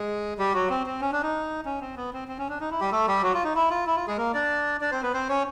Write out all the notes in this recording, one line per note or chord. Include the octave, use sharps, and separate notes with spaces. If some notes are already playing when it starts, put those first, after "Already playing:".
Already playing: G#3 G#4
G3 G4
F#3 F#4
C4
C4
C#4
D4
D#4
C#4
C4
B3
C4
C4
C#4
D4
D#4
E4
G3 G4
A3 A4
G3 G4
F#3 F#4
F4
D#4
E4
F4
E4
F4
G#3 G#4
A#3 A#4
D4 D5
D4 D5
C4 C5
B3 B4
C4 C5
C#4 C#5